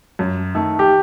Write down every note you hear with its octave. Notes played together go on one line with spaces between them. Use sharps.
F#2
D#3 A3
G4